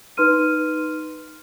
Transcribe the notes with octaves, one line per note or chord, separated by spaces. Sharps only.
D#4 B4 C6 F6 D#7